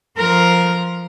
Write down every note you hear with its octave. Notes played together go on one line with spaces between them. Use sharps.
F3 A#4